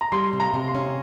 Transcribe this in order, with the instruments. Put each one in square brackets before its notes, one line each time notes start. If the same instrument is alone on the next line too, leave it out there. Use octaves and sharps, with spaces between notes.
[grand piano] A#5
[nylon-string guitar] G3 [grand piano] C6
[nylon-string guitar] C3
[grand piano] A#5
[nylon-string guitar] C3
[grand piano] C6
[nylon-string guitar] C#4